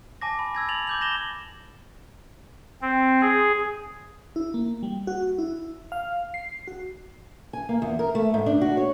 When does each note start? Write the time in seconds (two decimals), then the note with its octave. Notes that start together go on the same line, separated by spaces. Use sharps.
0.21 G#5 A5 D6 A#6
0.39 B5
0.55 E6 G#6 A#6
0.69 A6 F7 F#7
0.87 D6 G6 F#7
1.01 A#6 E7 G7
2.81 C4
3.22 G#4
4.36 E4
4.54 A#3
4.83 G3
5.07 F#4
5.38 E4
5.92 F5
6.34 C7
6.68 F#4
7.53 G#5
7.69 A#3
7.82 E2
7.99 A#4
8.15 A3
8.34 G#2
8.46 D4
8.61 F#4
8.77 C#5